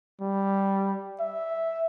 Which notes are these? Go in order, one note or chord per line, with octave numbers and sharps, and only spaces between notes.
G3
E5